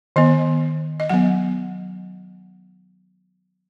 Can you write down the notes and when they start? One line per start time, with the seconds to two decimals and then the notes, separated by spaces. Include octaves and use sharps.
0.16 D#3 B3 D#5
1.00 D#5
1.10 F#3 B3 F#5